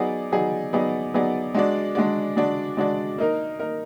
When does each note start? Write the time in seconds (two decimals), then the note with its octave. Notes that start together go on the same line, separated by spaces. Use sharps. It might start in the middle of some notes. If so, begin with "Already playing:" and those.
Already playing: F#3 B3 D#4 G#4 D5
0.32 F#3 B3 D#4 G#4 D5
0.73 F#3 B3 D#4 G#4 D5
1.14 F#3 B3 D#4 G#4 D5
1.54 G#3 D4 F#4 D5
1.95 G#3 D4 F#4 D5
2.36 G#3 D4 F#4 D5
2.77 G#3 D4 F#4 D5
3.18 A#3 D#4 A#4
3.59 A#3 D#4 A#4